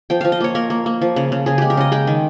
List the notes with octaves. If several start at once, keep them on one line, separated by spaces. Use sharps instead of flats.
F3 G5
F3 F5
D#5
A#3 C#5
A#3 A#4
A#3
A#3
F3
C#3
C#3
C#3 G#4
G#3 G4
A#4
C#3 D#5
G#3 G5
D#3